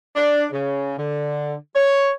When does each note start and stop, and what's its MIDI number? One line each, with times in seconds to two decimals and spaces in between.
0.15 0.45 62
0.52 0.96 49
0.96 1.53 50
1.75 2.09 73